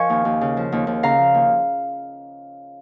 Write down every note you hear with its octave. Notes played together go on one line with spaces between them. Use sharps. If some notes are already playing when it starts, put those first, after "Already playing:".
Already playing: F3 A#4 D#5 F5 G#5 C#6
D#2
D#2
C#3
F3
D#2
D#2
C#3 F5 A#5
F3
D#2